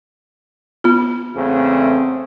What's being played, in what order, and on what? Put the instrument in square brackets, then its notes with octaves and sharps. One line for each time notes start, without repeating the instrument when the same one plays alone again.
[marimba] B3 F4
[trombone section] E2 C#3 A3 [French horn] C4